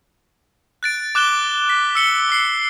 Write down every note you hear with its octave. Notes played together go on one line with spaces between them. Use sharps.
F#6 A6 D7
D6 F#6 E7 G7
B6
E6 C#7 G7
E6 C7 C#7